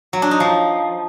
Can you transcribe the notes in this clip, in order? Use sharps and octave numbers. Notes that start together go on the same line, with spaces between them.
F#3
D4
D#4
F3